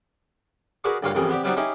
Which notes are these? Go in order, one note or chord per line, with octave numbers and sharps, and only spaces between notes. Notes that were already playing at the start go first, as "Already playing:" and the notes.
F#4 G#4 A#4 B4 D5
D2 G2 A#3 F4 C#5 F5
A1 F2 G3 A#3 G#4
B3 C4 G4 D5
F#3 G3 B3 C4 D4 D#4
C#4 D#4 E4 G4 G#4